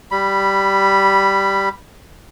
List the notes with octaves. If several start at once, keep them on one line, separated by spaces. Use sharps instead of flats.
G3 B5